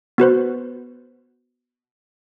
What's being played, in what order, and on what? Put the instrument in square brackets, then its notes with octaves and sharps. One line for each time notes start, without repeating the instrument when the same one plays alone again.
[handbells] B3 F#4 B4 C5